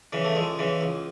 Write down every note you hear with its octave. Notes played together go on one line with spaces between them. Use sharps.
C#3 E3
A3
C#2 G#3
C#3 E3
C#2